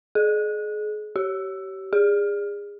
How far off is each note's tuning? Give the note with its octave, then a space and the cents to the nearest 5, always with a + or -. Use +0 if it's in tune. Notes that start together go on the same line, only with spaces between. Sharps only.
G#4 +35
G4 -30
G#4 -25